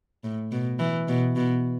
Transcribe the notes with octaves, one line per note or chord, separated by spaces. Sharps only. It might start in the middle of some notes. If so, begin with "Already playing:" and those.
A2
B2
E3
B2
B2